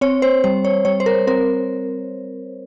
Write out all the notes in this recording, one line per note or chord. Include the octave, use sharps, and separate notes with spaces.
C4 C#5
C5
G3 C5
C#5
G3 C#5
C5
A#4
C4 A#4